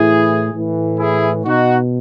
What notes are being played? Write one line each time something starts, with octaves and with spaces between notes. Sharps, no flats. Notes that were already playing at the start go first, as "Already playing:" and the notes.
Already playing: A2 E3 E4 G#4
A2 E3
E4 G#4
B2 D#4 F#4